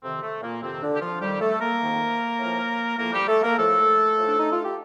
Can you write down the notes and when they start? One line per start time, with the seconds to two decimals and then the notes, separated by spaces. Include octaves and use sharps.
0.03 F2 C3 D#3 C4
0.22 A3
0.42 A#2 A#3
0.62 F2 C3 D#3 C4
0.82 D3 D4
0.95 G4
1.01 F3 F4
1.21 F2 D#3 G3 G4
1.40 A3 A4
1.60 A#3 A#4
1.80 F2 D#3
2.39 A2 F3
2.99 A2 F3 A#3 A#4
3.13 G3 G4
3.28 A3 A4
3.43 A#3 A#4
3.57 A2 F3 A3 A4
4.17 A2 F3
4.27 D4
4.38 D#4
4.51 F4
4.63 G4